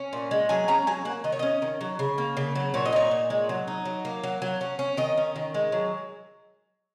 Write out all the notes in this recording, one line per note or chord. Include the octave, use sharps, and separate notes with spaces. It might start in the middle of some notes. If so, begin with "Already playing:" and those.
Already playing: C#4
A#2
G#3
F#3 G#5
C#4 A#5
F#3 G#5
A#3 F#5
D#3 D#5
C#5
C#4 D#5
D#3
F#3
C#3
A#3
C#3
F#3
A#2 C#5
D#5
D#4 C#5
A#2
G#3
F#3
D#4
F#3
A#3
F#3
F#3
C#4
C#4
D#3 D#5
C#4
D#3
G#3
F#3